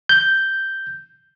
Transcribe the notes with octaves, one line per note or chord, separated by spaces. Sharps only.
G6